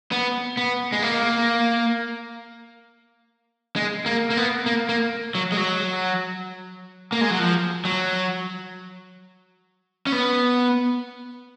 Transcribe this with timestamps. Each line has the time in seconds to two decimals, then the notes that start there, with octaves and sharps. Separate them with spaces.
0.12 B3
0.57 B3
0.92 G#3
1.02 A#3
3.76 G#3
4.06 A#3
4.30 A#3
4.37 B3
4.66 A#3
4.89 A#3
5.35 F#3
5.52 G#3
5.57 F#3
7.12 A#3
7.21 G#3
7.31 F#3
7.39 F3
7.85 F#3
10.07 C#4
10.12 B3